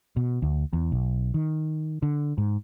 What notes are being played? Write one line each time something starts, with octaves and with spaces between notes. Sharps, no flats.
B2
D2
E2
B1
D#3
D3
G#2